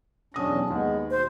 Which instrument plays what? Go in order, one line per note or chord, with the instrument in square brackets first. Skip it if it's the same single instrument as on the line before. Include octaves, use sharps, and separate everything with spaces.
[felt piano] B1 D#6 A#6 [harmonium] E2 C#4 D4
[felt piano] D#2 [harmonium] G#3 B3
[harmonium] B2 [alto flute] C5